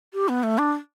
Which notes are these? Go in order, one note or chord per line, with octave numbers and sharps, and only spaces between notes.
G4
B3
A3
D4